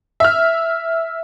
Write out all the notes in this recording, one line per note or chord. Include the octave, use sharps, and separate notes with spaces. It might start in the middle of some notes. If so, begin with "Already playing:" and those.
E5 F6